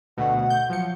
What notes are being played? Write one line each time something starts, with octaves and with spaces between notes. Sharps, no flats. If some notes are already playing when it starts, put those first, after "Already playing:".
D2 B2 A3 F#5
G6
F3 F#3 F5 C#7